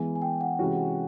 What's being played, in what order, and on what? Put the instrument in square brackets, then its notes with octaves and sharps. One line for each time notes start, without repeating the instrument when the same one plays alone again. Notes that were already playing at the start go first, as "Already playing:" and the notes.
Already playing: [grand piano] E3 G#3 B3 [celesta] G#5
[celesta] G#5
G5
F#5
[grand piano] C3 E3 G#3 C#4 F#4